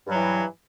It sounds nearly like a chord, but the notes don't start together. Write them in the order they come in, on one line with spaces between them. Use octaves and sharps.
G2 F#3 E3